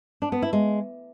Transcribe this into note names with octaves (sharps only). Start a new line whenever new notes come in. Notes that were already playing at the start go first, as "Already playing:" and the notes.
D4
B3
E4
G#3